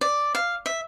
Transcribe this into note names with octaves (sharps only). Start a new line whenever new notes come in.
D5
F5
E5